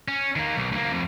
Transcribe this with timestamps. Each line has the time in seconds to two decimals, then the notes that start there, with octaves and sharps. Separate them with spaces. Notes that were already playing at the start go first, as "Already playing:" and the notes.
0.08 C#4
0.36 D#3 A#3
0.56 B1
0.72 D2 A#3
0.92 F2